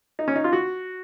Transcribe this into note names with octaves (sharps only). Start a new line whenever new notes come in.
D#4
C#4
D#4
F4
F#4